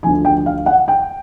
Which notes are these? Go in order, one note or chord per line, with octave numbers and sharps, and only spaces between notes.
D2 D3 F3 G#5
G5
F5
F#5
G5